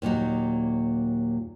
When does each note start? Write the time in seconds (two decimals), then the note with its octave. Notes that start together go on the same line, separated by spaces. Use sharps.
0.02 D#2 A#2 F#3 D#4